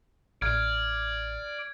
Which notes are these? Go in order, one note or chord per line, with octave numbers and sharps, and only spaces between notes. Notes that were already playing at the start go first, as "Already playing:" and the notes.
A1 D5 F6 G#6